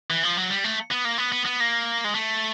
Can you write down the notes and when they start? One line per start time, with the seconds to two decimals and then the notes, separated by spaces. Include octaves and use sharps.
0.10 E3
0.23 F3
0.37 F#3
0.50 G3
0.64 A3
0.91 B3
1.05 A#3
1.18 B3
1.32 B3
1.45 B3
1.60 A#3
2.04 G#3
2.15 A3